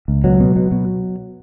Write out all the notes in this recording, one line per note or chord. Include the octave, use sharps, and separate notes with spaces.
C#2
B2 F#3
B2
B2
B2